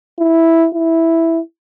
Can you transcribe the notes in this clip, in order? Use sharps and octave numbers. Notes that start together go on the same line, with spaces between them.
E4
E4